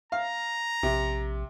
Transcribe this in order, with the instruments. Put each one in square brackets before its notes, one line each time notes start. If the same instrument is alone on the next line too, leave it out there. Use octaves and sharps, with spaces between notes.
[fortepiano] F5 [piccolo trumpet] A#5
[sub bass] A#1 [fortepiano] C3